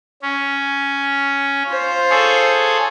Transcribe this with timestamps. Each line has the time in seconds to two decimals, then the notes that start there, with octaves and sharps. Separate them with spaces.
0.22 C#4
1.68 F4 C5
2.10 G#4 A4 C#5